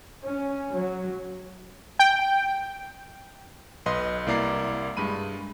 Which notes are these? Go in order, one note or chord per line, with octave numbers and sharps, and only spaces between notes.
C#4
F#3
G5
B1 B4 D#5 C6
C2 A#3 E4 D5 A#5 C7
G2 G#3 B5 D#7